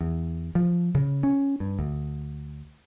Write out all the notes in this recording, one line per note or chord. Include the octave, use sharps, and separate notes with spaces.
E2
F3
C#3
C#4
G2
D2